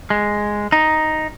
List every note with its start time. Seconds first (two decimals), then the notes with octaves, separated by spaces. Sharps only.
0.10 G#3
0.72 D#4